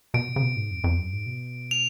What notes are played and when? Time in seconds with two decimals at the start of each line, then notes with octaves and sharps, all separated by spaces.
0.14 B2 D7
0.36 C#3
0.42 B2
0.56 G#2
0.71 F2
0.84 F2
0.99 F#2
1.13 G#2
1.26 B2
1.71 F7